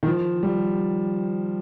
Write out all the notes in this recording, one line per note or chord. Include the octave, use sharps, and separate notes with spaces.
D#3
F3
G3